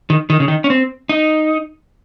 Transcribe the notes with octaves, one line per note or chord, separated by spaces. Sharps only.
D#3
D#3
C#3
D#3
C#4
C4
D#4